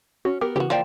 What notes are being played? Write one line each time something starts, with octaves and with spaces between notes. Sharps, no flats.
C#4 F#4
B3 G4 A#4
C#3 E3 F#4 G4
F3 A#3 D5 G5